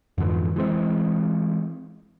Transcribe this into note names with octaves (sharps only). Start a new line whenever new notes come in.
F2 G#2 D3 E3
E3 G#3 C4